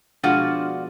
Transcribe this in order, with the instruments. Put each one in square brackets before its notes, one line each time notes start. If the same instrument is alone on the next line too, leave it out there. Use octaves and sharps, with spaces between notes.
[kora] B2 F3 G#3 [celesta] D4 F6 [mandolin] F4 F#4 D5